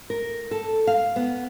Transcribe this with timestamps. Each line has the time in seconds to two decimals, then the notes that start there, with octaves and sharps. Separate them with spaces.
0.10 A#4
0.51 A4
0.87 F5
1.16 B3